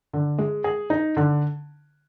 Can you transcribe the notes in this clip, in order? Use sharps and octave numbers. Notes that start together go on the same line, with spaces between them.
D3
G#3
G#4
D#4
D3